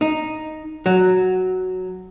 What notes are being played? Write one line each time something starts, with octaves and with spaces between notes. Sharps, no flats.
D#4
F#3